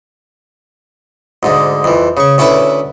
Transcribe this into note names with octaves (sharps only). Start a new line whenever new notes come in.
D2 G#2 D3
F2 E3
C#3 C#6
D2 C#4 E4 A4 B4 E5